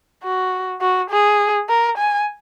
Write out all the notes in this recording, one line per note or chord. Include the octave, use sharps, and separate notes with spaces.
F#4
F#4
G#4
A#4
G#5